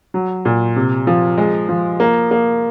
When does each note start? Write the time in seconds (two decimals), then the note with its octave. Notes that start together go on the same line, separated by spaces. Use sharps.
0.14 F#3
0.45 A#2
0.76 C3
1.07 F3
1.38 G#3
1.69 F3
2.00 A#3
2.31 A#3